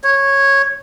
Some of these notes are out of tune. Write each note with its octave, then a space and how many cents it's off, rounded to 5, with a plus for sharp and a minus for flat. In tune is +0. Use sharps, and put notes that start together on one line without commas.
C#5 -10